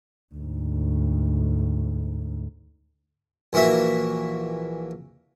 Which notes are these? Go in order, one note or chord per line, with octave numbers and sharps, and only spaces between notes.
D2 G#2
A#1 E3 A#3 F#4 E5